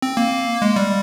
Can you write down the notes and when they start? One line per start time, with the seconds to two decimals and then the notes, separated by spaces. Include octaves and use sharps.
0.02 C4
0.17 A#3
0.62 G#3
0.76 G3